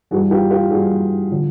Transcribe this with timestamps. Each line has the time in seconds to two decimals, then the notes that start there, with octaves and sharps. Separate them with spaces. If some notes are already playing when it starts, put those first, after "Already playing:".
0.11 G2 E3 G3 F#4 G#4
0.31 F4 G4
0.51 F4 G4
0.70 G2 E3 G3 F#4 G#4
1.30 D3 F3